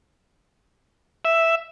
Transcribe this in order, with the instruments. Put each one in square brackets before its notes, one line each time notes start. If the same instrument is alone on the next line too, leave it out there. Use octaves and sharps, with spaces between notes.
[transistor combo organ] E5